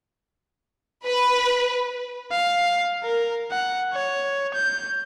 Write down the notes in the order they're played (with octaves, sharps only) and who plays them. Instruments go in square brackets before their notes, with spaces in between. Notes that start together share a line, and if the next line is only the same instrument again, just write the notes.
[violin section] B4
[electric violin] F5
A#4
F#5
C#5
G6